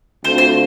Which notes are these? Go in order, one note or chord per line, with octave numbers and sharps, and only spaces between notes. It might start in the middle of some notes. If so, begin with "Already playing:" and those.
D2 D3 A3 C4 F4 C5
C5